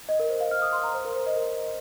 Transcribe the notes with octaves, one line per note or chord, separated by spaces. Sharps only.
D#5
A#4
C5
F5
F6
D#6
C6
A#5
C5
A#4
C5
D#5
A#4